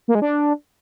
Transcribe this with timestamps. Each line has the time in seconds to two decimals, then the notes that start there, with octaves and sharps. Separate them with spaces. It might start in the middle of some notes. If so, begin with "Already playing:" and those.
0.08 A#3
0.15 G#3
0.22 D4